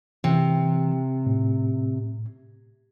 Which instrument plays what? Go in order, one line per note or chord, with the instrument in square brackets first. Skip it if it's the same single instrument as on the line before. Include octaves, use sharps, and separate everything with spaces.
[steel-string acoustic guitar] C3 [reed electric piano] E3
[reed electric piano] A2